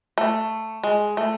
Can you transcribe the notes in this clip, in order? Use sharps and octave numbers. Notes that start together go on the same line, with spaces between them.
A3
G#3
A3